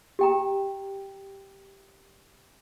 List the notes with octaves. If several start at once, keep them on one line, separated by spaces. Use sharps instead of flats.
G4 G5 A#5